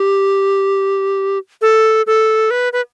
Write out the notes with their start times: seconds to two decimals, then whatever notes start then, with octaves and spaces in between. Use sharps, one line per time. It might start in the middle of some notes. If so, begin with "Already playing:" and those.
Already playing: G4
1.61 A4
2.07 A4
2.51 B4
2.73 B4